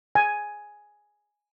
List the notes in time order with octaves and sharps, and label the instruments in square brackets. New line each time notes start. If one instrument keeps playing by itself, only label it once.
[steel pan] G#5